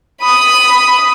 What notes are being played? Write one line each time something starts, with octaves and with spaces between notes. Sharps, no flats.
B5 D#6